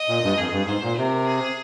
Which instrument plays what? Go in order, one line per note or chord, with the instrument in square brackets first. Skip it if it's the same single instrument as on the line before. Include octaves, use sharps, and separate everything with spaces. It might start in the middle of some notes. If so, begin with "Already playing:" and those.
Already playing: [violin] D#5
[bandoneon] A#2
G2
[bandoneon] F2 [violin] G#4
[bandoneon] G2
[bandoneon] G#2 [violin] C5
[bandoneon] A#2
[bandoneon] C3 [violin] A#4
[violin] G#4